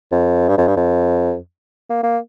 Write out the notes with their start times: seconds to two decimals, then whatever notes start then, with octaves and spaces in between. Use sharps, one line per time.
0.12 F2
0.49 G2
0.58 F2
0.68 G2
0.76 F2
1.90 A#3
2.03 A#3